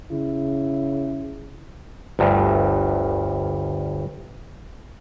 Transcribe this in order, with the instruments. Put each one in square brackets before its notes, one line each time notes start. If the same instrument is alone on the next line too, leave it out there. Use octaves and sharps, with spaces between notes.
[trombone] C#3 [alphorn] E4
[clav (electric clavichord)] G1 D2 G2